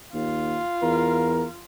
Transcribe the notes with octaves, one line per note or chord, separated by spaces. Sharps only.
D#2 F4
E2 A#4